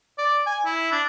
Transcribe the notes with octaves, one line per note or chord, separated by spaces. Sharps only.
D5
G#5
E4
D4